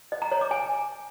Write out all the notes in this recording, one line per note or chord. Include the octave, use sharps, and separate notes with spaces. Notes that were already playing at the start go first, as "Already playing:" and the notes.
D#5
A#5
C#5
D6
G#5